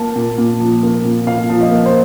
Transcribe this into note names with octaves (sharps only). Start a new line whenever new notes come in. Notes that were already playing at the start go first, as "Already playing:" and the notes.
Already playing: A#3 A5
A#2
A#2
F3
A#3
A#2
A#2 F5
F3
D#5
A#3
C5